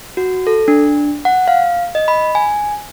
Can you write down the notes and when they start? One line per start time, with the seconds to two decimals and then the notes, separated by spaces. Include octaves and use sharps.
0.17 F#4
0.47 A4
0.68 D4
1.25 F#5
1.48 F5
1.95 D#5
2.08 B5
2.35 G#5